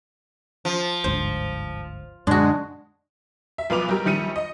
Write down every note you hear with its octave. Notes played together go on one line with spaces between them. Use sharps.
F3
G1 D2 G#2 C5
F#2 A#2 D3 G#3 D4 F#4
E5
B1 F3 B3 B4 D6 F7
F#3 G3 G4 A#4
A#1 D#3 G3 C#7 D#7
D#5